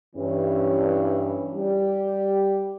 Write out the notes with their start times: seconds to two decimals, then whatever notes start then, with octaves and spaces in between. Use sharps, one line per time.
0.15 G2 E3 C#4
1.54 G3 G4